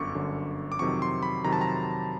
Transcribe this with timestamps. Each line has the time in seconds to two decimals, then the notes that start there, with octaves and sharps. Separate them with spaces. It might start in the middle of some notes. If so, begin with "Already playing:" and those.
Already playing: G1 F#2 D3 C#6 D6
0.15 G1 F#2 D3
0.72 D6
0.79 F2 C3 D#3 F#3 C#6
1.02 C6
1.23 B5
1.44 F2 C3 D#3 F#3 A#5
1.53 A5
1.61 A#5